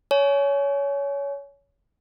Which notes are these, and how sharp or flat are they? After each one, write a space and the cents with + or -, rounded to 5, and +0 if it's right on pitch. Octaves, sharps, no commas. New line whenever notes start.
C#5 +20 G#5 +30